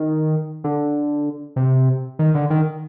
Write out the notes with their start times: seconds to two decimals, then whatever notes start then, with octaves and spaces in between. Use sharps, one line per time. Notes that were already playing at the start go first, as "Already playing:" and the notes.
Already playing: D#3
0.64 D3
1.56 C3
2.19 D#3
2.35 D3
2.50 D#3